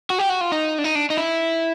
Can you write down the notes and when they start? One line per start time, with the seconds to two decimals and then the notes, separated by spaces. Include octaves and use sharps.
0.10 F#4
0.19 G4
0.29 F#4
0.41 F4
0.52 D#4
0.78 D4
0.84 D#4
0.95 D4
1.10 D#4
1.17 E4